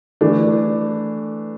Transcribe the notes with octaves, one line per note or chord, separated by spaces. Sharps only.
E3 A3 D4